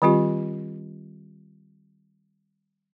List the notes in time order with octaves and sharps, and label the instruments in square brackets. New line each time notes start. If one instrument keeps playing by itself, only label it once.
[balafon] D#3 G3 C4 F4 G4